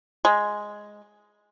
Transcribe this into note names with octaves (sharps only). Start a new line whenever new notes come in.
G#3